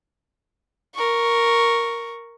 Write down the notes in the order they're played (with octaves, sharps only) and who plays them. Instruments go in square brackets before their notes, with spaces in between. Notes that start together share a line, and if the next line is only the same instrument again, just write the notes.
[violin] A#4 C#6